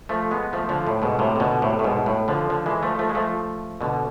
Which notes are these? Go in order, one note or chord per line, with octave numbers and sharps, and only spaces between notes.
F3 A3
G#3 B3
F3 A3
D3 F3
A2
G#2 B2
A2 C3
C3
B2 D3
A2 C3
A2
G#2 B2
A2
D3 F3
D3 F3
E3 G#3
F3 A3
F3 A3
G#3
F3 A3
B2 D3